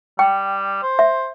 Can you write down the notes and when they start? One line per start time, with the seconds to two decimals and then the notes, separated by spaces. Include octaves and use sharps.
0.19 G3 G5
0.82 C5
0.99 E5